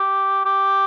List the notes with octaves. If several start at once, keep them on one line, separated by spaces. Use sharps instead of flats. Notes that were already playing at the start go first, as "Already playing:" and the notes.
Already playing: G4
G4